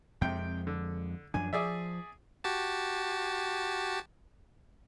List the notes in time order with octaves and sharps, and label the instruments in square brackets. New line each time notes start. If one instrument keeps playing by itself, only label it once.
[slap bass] F2 G#3 [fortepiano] C3 G5
[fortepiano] D3
[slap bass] F#2 F3 D4 [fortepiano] G#5
[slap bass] F3 [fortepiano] G#4 D5 E5
[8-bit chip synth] F#4 G4 A5